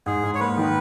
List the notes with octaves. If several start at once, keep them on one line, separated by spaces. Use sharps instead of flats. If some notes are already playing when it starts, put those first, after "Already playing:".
G#2 G#4
G#2
C#5
A#3 B4
D#3